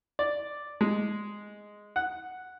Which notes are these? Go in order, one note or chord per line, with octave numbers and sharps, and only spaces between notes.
D5
G#3
F#5